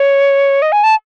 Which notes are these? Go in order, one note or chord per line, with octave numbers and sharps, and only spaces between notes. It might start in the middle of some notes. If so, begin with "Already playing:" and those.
Already playing: C#5
D#5
G#5
A5